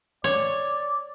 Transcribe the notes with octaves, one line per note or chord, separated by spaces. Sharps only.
C#5 D5